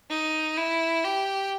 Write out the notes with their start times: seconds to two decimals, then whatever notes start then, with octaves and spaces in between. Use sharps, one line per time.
0.10 D#4
0.57 E4
1.05 G4